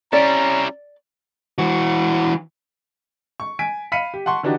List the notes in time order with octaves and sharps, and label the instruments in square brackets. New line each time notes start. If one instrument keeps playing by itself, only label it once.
[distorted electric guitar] G3 E4 [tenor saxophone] C#4 [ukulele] D5 [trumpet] A#5
[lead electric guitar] E3 F#4
[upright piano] C#6
G#5 B6 D7
F5 B5 B6 C#7 D#7
G4
F#5 A5 C6 C#6
D3 E3 D4 D#4 F#4 G4